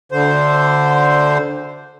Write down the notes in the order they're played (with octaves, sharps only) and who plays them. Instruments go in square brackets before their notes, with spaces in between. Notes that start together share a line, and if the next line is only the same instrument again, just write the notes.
[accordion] D2 D3 C5